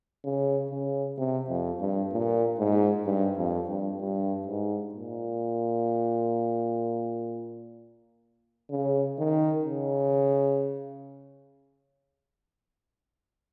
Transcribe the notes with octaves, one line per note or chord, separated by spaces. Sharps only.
C#3
C#3
C3
F2
G2
A#2
G#2
G2
F2
G2
G2
G#2
A#2
C#3
D#3
C#3